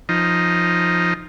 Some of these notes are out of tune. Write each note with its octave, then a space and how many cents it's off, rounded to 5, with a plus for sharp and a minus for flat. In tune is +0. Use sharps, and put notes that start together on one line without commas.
F3 +0 D#4 +0